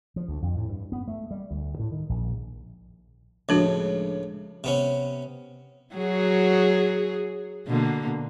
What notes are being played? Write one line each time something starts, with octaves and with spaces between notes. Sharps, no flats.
F3
D2
F2
A2
G2
B3
A3
G3
D2
A2
D#3
A#1
C#2 A2 F3 D4 F#4
C3 B3 C#4
F#3 F#4 G#4
B2 D3 A#3